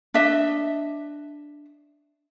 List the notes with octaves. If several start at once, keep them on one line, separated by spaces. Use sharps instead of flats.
D4 D#5 E5